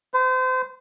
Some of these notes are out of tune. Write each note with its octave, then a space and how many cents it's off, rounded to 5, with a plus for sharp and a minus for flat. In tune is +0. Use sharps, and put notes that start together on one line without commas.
C5 -35